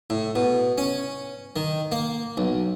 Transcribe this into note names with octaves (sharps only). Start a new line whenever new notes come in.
A2
B2
C#4
D#3
A#3
B1